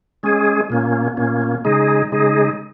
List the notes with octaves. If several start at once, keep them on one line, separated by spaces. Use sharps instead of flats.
G#3 C#4 G#4
A#2 A#3 C#4
A#2 A#3 C#4
C#3 G#3 D#4 G#4
C#3 G#3 D#4 G#4